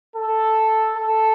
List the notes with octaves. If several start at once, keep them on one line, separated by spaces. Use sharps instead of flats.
A4
A4